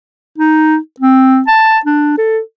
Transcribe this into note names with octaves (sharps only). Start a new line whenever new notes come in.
D#4
C4
A5
D4
A4